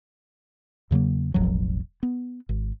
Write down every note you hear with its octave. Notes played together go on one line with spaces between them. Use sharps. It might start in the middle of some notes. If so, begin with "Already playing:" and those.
E2 C#3 F#3 A#3
E1 A1 F3 F#3
B3
G#1